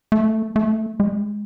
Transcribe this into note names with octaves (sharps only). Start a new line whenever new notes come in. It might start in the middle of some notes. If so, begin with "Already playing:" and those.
A3
A3
G#3